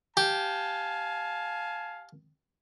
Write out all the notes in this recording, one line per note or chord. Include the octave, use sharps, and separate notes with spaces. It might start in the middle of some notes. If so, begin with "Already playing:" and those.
G4 F5 G#5 A5